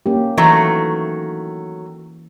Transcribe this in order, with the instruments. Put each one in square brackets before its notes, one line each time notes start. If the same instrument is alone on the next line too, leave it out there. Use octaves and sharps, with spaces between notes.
[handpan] A#3 C#4 G4
[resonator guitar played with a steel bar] D#3 F#3 A3 [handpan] E3